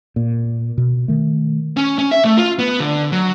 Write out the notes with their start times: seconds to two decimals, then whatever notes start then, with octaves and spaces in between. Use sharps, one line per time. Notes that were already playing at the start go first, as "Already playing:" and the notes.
0.16 A#2
0.78 B2
1.08 D#3 A3
1.77 C#4
1.98 C#4
2.11 E5
2.25 A3
2.37 F4
2.59 B3
2.80 D3
3.12 F#3